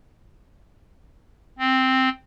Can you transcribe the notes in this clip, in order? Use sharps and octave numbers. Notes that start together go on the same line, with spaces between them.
C4